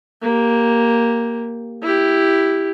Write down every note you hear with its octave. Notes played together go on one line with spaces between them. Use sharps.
A#3 G4
E4 G4